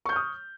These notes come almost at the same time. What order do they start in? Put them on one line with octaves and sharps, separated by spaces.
C#6 G6 F6 D#6